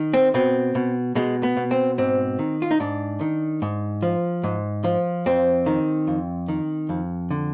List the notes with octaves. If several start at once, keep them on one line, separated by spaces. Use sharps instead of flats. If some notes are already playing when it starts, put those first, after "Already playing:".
Already playing: D#3
C4
B2 C4
B2
B2 G#3
B3
B2
C4
G#2 C4
D#3
F4
D#4
G#2 D4
D#3
G#2
F3
G#2
F3
F2 C4
D#3
F2
D#3
F2
D3